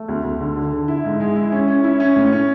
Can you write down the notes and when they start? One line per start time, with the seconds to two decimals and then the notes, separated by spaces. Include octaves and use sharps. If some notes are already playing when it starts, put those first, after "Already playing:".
Already playing: A3
0.09 D2
0.24 D2
0.40 D3
0.56 D3
0.73 D3
0.88 E4
1.04 G#2
1.20 G#3
1.36 E4
1.52 C#4
1.68 C#4
1.84 E4
2.00 C#4
2.16 A2
2.32 C#4